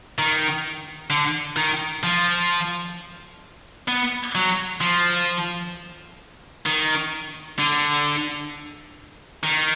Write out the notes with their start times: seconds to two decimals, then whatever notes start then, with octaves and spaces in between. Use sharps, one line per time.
0.19 D#3
1.10 D3
1.57 D#3
2.03 F3
3.88 B3
4.35 F#3
4.81 F3
6.66 D#3
7.59 D3
9.44 D#3